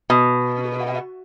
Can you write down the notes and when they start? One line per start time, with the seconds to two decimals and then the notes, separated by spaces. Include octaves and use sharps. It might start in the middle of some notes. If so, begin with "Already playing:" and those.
0.10 B2